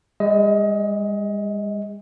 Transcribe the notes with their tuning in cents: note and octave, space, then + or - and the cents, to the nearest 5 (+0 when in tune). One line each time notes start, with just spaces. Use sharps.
G#3 -45 D#5 +25